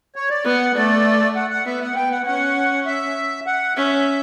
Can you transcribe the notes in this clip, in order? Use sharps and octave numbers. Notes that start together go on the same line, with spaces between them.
C#5
D5
B3 F#5
A3 D5
F#5
F#5
B3 E5
F#5
B3 G5
F#5
C#4 F#5
E5
F#5
C#4 E5